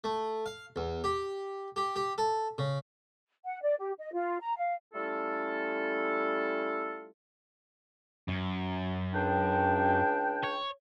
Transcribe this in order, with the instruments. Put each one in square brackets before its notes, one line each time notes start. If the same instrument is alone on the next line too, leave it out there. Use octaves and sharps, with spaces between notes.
[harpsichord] A3
F5
E2
G4
G4
G4
A4
C#3
[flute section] F#5
D5
G4
D#5
F4
A#5
F5
[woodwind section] G3 A3 C#4 E4 F4 A4
[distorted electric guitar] F#2
[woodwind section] C#2 D4 G5
[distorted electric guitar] C#5